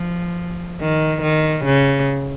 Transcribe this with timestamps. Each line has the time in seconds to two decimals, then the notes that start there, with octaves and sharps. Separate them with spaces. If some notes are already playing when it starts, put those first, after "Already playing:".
Already playing: F3
0.81 D#3
1.22 D#3
1.65 C#3